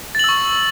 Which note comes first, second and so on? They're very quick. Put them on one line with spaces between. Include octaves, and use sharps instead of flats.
A6 F#7 E6 C#6